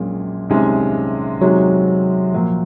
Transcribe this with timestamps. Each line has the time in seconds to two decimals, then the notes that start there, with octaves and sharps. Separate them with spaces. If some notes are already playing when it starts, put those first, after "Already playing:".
Already playing: A#1 A#2 F#3 G#3 C#4
0.50 C2 C3 D#3 G#3 C#4
1.42 C3 D#3 F#3 G#3
1.88 F#3
2.34 A#2 F3 F#3 A#3